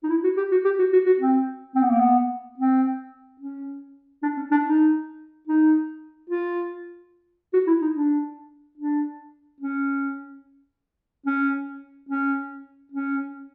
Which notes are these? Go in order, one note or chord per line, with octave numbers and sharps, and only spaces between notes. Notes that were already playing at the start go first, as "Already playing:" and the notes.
D#4
E4
F#4
G4
F#4
G4
F#4
F#4
F#4
C4
C4
B3
A#3
B3
C4
C#4
D4
C#4
D4
D#4
D#4
F4
F#4
E4
D#4
D4
D4
C#4
C#4
C#4
C#4